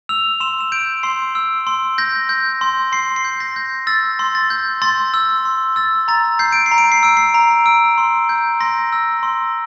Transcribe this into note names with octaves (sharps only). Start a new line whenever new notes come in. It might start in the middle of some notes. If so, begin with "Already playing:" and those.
E6 F7
C6 E7
E7
G6 D7
C6 C7
E6
C6
G6 A#6
G6
C6
C6 C7
C7
G6
A#6
G6
E6 A6
C6
A6
G6
C6 A6
E6
C6
E6 A6
A#5 A6
G6 C7
D7
C7
A#5
D7
C7
E6 D7
C7
A#5
E6 D7
C6
G6
C6 A#6
E6
C6